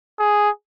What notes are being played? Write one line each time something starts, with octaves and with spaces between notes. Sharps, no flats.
G#4